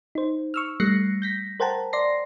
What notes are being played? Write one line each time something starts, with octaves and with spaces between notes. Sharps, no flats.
D#4 C5
C#6 E6 F6
G3 A3 F#6 A#6 C7 C#7
G6 A#6 B6
A#4 C5 F#5 G5 A5 A#5
D5 C6 A#6 C7